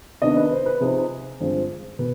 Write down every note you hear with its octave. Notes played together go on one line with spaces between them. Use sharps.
C3 D#3 B3 D4 D#5
B4
C5
B4
C3 F3 C4 D#4 G#4
G2 D3 F3 G#3 C4
B2 B4